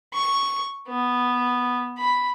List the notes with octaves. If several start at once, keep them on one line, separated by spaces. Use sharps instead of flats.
C#6
B3
B5